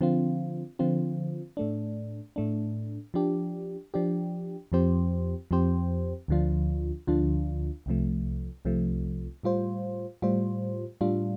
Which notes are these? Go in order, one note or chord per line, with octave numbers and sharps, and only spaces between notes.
D3 F3 C4 F4
D3 F3 C4 F4
A2 A3 D4
A2 A3 D4
F3 D4 G4
F3 D4 G4
F2 F3 C4 G4 C5
F2 F3 C4 G4 C5
D2 D3 F3 D4 F4
D2 D3 F3 D4 F4
C2 C3 F3 A3
C2 C3 F3 A3
A2 G3 F4 C5
A2 G3 F4 C5
A2 G3 D4 F4